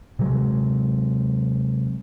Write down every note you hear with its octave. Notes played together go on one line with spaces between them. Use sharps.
C3 F#3 G#3